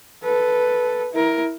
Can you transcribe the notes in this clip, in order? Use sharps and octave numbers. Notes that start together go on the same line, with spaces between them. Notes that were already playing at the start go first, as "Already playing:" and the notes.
A4 B4
E4 A#4